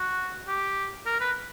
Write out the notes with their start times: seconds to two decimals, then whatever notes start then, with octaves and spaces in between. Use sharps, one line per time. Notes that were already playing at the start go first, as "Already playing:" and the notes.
Already playing: F#4
0.47 G4
1.06 A#4
1.20 B4